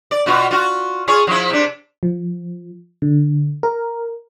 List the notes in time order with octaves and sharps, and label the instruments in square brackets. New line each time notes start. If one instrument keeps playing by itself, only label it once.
[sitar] D5
B2 F4 F#4
F4 F#4
F4 G#4 C#5
F3 E4
C3 D4
[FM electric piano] F3
D3
A#4